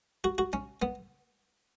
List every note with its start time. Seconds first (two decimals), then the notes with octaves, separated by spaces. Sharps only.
0.24 F#4
0.38 F#4
0.53 C#4
0.82 B3